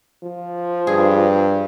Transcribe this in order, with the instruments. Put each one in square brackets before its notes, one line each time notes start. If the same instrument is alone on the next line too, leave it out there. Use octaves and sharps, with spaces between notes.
[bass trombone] F3
[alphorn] G2 [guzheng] G#4